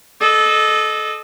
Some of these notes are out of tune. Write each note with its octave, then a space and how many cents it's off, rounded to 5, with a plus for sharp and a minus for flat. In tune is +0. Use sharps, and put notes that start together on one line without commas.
A4 -25 D#5 -20